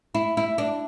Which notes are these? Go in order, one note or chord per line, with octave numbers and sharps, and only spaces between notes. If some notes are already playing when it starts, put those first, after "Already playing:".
E4
E4
D4